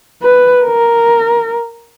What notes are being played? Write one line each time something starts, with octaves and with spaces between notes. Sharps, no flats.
B4
A#4